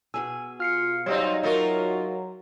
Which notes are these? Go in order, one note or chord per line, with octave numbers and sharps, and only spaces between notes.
B2 G#4 G#5 E6
F4 F6 C7 C#7
F#3 G3 C4 D#4 C#5 F5
F#3 D#4 F4 F#4 G#4 A#4 E5